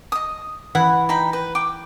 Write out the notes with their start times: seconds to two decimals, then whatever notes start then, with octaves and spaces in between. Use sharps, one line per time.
0.12 D#5 D#6
0.75 E3 E4 F#5
1.09 D#4 G5 B5
1.33 B4
1.55 G5 D6